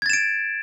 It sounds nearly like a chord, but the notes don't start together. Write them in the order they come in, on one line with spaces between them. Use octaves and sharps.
G#6 A6 E7 D7